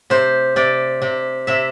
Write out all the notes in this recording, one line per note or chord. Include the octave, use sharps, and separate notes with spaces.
C3 C5
C3 D5
C3
C3 E5